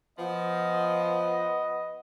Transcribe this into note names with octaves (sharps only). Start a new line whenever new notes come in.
F3 B3 D#5